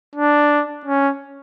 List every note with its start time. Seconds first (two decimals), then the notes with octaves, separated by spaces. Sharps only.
0.16 D4
0.86 C#4